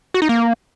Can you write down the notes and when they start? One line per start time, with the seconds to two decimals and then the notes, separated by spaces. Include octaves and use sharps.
0.14 F#4
0.22 D#4
0.29 A#3